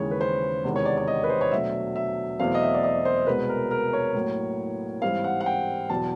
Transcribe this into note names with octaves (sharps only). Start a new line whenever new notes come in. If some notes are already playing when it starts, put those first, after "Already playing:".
Already playing: D#2 C#3 E3 G#3 C#5
B4
C5
E2 C3 D#3 G#3 B3
C#5
D5
D5
D#5
B4
C5
C#5
B2 F#3 A3 D4 E5
E5
E2 B2 F#3 A3 C4 F5
D#5
E5
D5
D#5
C5
C2 B2 G#3 B3 B4
A#4
A#4
C#5
A2 F#3 A#3
G#2 E3 G3 C4 F5
F#5
F#5
G5
E2 B2 F#3 A5